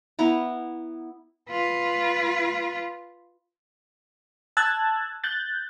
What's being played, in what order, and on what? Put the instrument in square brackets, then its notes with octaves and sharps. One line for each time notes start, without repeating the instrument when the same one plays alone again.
[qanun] B3 E4 A#5
[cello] F4 B4
[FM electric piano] A5 E6 F#6 G#6 A6
F#6 G6 A6